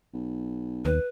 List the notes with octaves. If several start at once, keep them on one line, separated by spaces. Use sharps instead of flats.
B1
D#2 B4